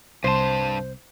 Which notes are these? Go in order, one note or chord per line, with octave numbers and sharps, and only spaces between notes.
C2 G2 C5 A5